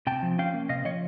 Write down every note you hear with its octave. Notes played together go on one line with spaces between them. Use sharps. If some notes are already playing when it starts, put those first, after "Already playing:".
C3 G5 A5
F3
C#4 F5 G5
A#3
C3 D#5 F5
F3 C#5 D#5